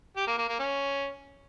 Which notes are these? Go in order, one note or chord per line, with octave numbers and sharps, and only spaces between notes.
G4
A#3
A#3
A#3
C#4